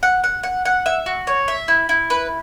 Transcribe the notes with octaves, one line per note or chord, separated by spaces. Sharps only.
F#5
F#5
F#5
F#5
E5
F#4
C#5
E5
E4
E4
B4